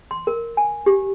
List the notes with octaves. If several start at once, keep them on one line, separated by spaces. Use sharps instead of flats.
C6
A#4
G#5
G4